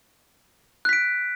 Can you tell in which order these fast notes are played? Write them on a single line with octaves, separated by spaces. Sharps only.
F#6 B6 D7